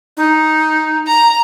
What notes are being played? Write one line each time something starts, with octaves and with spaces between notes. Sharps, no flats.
D#4
A#5